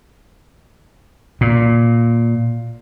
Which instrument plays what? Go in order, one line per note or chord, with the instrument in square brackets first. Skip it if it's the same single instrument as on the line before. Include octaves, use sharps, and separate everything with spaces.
[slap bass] A#2